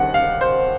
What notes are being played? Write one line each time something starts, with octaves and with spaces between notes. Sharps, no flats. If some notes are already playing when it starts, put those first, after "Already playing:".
Already playing: D#2 D#3 G3 F#5
F5
C5